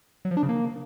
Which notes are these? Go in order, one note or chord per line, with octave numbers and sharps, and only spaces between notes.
F#3
F3
D4
C#3
A#3